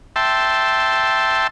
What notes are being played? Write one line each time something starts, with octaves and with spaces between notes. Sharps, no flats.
E5 G5 A5 C6